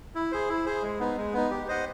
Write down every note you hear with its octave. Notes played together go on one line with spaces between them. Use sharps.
E4
G#4 C5
E4
G#4 C5
G#3
B3 D#4
G#3
B3 D#4
G4
C5 D#5 F#5